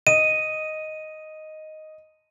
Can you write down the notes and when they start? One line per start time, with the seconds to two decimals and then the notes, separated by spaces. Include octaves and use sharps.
0.07 D#5 D#7